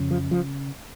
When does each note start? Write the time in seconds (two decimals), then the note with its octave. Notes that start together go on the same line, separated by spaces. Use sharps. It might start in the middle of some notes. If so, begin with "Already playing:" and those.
Already playing: F2 C#3
0.11 F3
0.31 F3